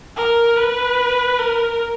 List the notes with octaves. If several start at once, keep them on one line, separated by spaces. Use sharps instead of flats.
A#4
B4
A#4